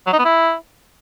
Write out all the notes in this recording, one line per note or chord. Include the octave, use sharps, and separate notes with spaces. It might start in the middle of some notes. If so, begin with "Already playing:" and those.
F#3
D#4
B3
E4